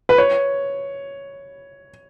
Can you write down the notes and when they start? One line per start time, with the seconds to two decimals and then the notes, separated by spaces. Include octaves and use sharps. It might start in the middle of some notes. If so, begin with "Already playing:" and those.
0.09 B4
0.18 C#5